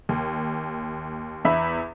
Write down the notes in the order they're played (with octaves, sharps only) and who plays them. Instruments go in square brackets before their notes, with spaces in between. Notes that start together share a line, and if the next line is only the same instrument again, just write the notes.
[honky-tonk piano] D#2
E2 E5 B5